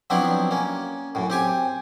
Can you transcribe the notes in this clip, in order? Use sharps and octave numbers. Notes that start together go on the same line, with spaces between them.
F3 F#3 B3 C4 D4 E4
A#3 C#4
F#2 A2
C4 G4 G#5